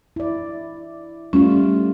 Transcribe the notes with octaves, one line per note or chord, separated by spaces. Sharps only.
E4 D5
G3 A3 C#4 F4